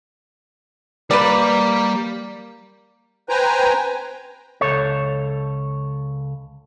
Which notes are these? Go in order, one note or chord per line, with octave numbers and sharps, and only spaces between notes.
G3 A#3 B4 D5
B4 C5 G5 G#5 A#5
C#2 A4 C#5